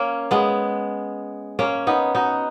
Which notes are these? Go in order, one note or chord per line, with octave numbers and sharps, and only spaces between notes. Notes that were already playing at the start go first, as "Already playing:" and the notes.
Already playing: A#3 C#4
G#3 B3
A#3 C#4
B3 D#4
D#4 F#4